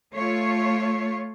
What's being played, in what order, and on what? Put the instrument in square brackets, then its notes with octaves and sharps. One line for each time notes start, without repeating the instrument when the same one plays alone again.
[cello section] A3 F4 C#5